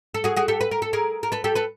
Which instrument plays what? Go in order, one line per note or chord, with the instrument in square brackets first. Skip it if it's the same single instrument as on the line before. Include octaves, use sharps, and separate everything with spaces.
[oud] A4
F#4 G#4
F#4 G#4
G4 A4
B4
A#4
A4
G#4 A#4
A#4
A4 B4
G4 A4
A4 B4